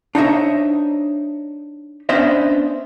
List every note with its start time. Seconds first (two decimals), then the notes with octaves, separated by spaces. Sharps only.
0.15 D4 D#4 C5 C#5 D#5 E5
2.09 B3 C#4 D4 C5 D#5 E5